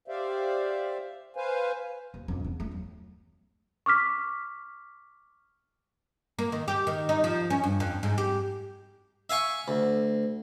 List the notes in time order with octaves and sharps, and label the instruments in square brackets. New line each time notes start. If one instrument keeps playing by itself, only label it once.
[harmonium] G4 C5 D5 E5 F5
B4 C5 F5 G#5
[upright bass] D#2
F2
E2
A3
F#3
[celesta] C#6 D6 F6 B6
[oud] A#3
D#3
G4
D#3
D#4
F3
C#4
G2
F2
G#2
G4
[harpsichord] E5 F5 G#5 C#6
D2